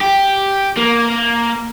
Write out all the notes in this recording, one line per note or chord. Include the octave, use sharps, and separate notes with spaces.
G4
A#3